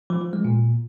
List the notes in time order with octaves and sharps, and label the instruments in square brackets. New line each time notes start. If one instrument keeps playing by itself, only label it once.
[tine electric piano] F3
F3
G#3
A#2